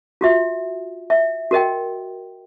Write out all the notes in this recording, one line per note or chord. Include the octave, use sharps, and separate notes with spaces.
F4 F#4 E5
E5
F#4 A#4 D#5 G5